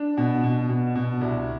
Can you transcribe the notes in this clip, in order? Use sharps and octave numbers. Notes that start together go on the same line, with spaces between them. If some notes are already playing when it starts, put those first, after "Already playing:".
Already playing: D4
B2
B2
B2
B2
C2